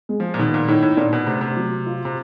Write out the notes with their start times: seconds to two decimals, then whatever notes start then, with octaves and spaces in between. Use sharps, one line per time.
0.09 G#3
0.20 F3
0.34 A#2
0.39 B2 D#3
0.54 A#2
0.68 A2 D#4
0.82 A2
0.97 A#2 D4
1.13 B2
1.27 C3 A3
1.41 C3
1.57 F#3
1.86 F4
2.05 C3